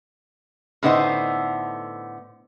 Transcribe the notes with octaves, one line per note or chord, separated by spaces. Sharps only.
A2 D3 B3 D#4 C5 F#5